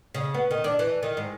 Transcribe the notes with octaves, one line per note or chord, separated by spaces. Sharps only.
C#3
B3
D#3
D4
E3
D#3
G#2